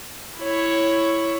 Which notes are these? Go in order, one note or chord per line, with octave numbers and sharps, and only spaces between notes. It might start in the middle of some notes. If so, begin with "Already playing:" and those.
E4 C#5